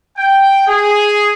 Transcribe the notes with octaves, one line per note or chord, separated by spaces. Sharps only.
G5
G#4